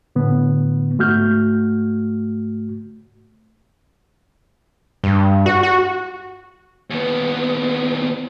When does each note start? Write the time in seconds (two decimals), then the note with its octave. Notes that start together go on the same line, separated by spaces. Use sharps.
0.16 A2 D3 B3
0.98 G#2 A3 F#4 F6 G6
5.04 G2
5.46 F#4
5.63 F#4
6.90 D#2 B3